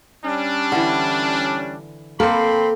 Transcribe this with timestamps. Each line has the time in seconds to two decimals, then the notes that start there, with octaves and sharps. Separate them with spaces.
0.25 G3 C#4 D4
0.72 D3 E3
2.20 A#3 C4 A4 B5 C6